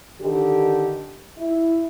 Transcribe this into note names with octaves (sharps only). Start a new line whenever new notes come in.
D3 D#3 G4
E4